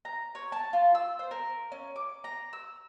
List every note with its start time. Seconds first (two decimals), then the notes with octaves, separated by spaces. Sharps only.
0.05 A#5
0.35 C#5
0.52 A5
0.73 F4
0.95 E6
1.19 C5
1.31 A#4
1.72 C#4
1.96 D6
2.24 A#5
2.53 E6